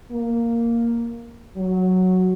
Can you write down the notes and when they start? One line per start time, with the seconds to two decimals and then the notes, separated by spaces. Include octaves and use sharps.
0.11 A#3
1.56 F#3